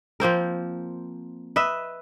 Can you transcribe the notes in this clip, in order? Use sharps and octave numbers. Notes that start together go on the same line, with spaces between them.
F3 A#3 C4 A#4
B4 D#5 E5